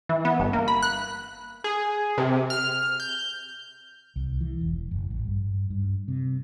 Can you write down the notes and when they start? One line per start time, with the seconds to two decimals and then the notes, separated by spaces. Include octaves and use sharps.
0.09 E3
0.25 B3
0.39 G1
0.53 A#3
0.68 B5
0.83 F#6
1.64 G#4
2.18 C3
2.50 F6
3.00 G6
4.16 C2
4.41 E3
4.61 E1
4.91 F#1
5.10 A1
5.25 G2
5.70 G2
6.08 C3